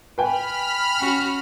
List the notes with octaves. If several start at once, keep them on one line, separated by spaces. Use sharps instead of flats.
B4 G5 G#5 B5 F6
C#4 F#4